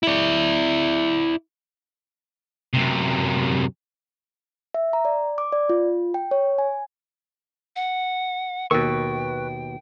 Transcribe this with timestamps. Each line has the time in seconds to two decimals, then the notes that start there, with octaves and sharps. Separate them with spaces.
0.03 E4 D5
2.73 F#2 C3
4.74 E5
4.93 A#5
5.05 D5
5.38 D6
5.52 D5
5.69 F4
6.14 G5
6.31 C#5
6.58 G#5
7.76 F#5
8.71 D#2 B2 A#4 B4 G5 C#6